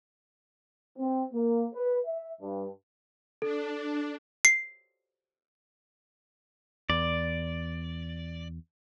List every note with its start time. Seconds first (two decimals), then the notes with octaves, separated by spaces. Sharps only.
0.98 C4
1.33 A#3
1.74 B4
2.06 E5
2.41 G2
3.42 D4 A4
4.45 C7
6.90 E2 D5